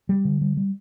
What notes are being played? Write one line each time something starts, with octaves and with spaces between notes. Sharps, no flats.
G3
D3
G3
G3